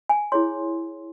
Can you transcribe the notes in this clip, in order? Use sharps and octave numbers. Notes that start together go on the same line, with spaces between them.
G#5
E4 G#4 C#5 C6